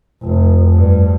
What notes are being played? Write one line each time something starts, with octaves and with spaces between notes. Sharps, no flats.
F1
G2